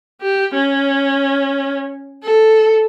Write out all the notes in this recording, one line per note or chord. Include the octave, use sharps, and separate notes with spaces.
G4
C#4
A4